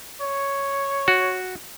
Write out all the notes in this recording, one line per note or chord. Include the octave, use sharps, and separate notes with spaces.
C#5
F#4